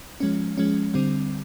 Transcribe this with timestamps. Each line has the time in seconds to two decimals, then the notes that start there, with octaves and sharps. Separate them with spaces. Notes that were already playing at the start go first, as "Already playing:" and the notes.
0.20 F3 G#3 C#4
0.58 F3 G#3 C#4
0.94 D3 G3 C4